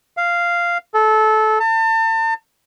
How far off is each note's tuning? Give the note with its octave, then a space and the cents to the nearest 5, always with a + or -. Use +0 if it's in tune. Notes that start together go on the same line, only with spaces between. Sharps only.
F5 -10
A4 -20
A5 +35